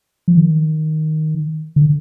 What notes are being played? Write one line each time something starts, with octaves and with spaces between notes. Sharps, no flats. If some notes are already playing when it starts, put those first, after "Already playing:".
F3
D#3
D3